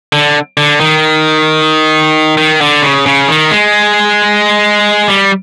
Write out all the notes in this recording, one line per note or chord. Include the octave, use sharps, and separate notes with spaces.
D3
D3
D#3
D#3
D3
C#3
C#3
D#3
G#3
G3